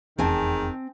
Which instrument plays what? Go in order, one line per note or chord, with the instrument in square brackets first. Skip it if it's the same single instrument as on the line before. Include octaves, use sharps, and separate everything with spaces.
[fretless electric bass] F1 E2 [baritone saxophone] D#3 [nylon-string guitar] C4 G#5 A5 [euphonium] G#4